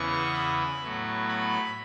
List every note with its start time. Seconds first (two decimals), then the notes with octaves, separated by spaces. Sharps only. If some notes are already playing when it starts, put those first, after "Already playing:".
Already playing: E2 C#3 E3 B3 C#6
0.34 B5
0.82 A2 F#3 B3
1.29 B5